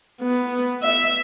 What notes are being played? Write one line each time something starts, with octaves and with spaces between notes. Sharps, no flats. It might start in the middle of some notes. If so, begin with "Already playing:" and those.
B3
E5